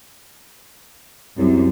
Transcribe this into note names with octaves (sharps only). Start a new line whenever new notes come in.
C2 F#2